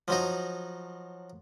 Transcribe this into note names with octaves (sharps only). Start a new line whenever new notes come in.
F3 F#3 D#4